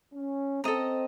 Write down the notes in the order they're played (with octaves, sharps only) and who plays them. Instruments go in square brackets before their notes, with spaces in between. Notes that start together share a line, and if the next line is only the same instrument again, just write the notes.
[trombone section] C#4
[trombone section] C4 [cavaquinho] A4 D#5 A#5